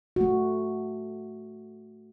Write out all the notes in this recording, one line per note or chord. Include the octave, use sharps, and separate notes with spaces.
A3 F#4